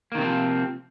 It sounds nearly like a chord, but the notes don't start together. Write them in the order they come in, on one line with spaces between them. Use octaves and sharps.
A#3 D#3 C3 C4 F3